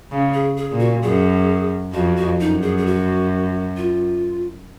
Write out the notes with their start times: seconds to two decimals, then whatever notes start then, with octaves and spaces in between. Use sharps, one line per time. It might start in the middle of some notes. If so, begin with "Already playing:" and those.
0.11 C#3
0.34 G#4
0.57 G#4
0.72 A#2
0.79 F#4
1.02 F#2 G#4
1.93 F2 F#4
2.16 F#4
2.40 F#2 D#4
2.62 G#4
2.78 G#4
2.86 F#4
3.77 F4